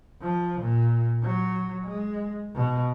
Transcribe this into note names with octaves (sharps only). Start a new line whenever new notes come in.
F3
A#2
F#3
G#3
B2